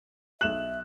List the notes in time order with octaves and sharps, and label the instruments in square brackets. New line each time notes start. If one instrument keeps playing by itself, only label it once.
[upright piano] B1 E7 F#7 [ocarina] E5 [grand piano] F#6